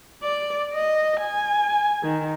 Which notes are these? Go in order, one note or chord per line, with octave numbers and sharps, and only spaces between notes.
D5
D#5
G#5
D#3